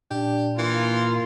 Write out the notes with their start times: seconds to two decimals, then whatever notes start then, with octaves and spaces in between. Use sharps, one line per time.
0.11 A#2 D4 G4
0.59 E3 A#3 F4